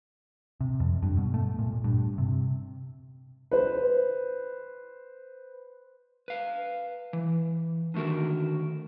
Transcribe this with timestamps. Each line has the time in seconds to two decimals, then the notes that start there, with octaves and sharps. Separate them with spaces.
0.61 C3
0.80 F2
1.03 G2
1.17 B2
1.34 A3
1.59 A#2
1.84 G2
2.18 C3
3.51 B4 C5
6.28 B4 F5
7.13 E3
7.94 D3 D#3 A3 F#4 A#4